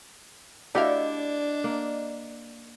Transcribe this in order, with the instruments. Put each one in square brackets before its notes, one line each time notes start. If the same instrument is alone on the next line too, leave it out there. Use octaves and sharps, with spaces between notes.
[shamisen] A3 F#4 F5 [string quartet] D4 [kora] E4 G4 [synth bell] D5 D#5
[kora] A#3